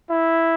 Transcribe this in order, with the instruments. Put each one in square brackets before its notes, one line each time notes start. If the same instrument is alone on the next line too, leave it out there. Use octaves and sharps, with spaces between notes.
[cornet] E4